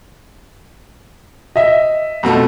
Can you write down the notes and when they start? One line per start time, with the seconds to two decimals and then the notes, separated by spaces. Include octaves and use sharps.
1.56 D#5 E5
2.23 F2 B2 A3